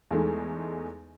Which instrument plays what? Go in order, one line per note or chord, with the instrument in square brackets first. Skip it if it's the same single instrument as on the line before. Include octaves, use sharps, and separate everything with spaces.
[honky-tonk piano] E2 G#3 A3 D#4